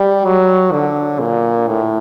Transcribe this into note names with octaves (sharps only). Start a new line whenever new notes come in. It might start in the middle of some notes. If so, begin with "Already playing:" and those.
Already playing: G3
F#3
D3
A#2
A2